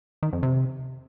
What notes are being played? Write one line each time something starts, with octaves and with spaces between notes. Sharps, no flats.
D#3
F2
C3